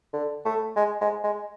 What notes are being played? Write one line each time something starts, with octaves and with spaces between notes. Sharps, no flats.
D3
A3
G#3
G#3
G#3